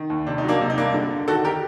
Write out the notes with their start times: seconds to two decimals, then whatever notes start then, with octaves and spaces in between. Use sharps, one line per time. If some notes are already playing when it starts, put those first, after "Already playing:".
Already playing: D#3
0.10 D#2
0.27 C3 D4
0.38 D#4
0.44 F#3 A#3 D4
0.61 C3
0.70 D#4
0.77 G2 A#3 D4
0.94 D3
1.11 D3
1.28 D#3 F#4 A4
1.45 G4 A#4